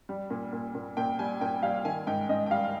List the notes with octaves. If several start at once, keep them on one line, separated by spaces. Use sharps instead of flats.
G3
A#2
A#2
A#2
A#2 G5
G3 G#5
A#2 G5
G3 F5
D#3 G#5
G#2 G5
G#2 D#5
G5
G3 F5